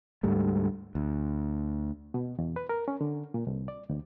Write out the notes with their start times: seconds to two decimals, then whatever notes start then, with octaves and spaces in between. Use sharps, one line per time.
0.23 D2 G#2 G3 A3
0.95 D2
2.14 B2
2.39 E2
2.56 B4
2.69 A#4
2.88 C#4
3.01 D3
3.34 A#2
3.47 C2
3.68 D5
3.89 D2